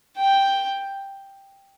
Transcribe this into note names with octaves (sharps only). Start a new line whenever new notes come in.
G5